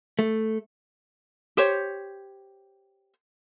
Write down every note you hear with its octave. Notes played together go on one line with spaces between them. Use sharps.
A3
G4 C5 C#5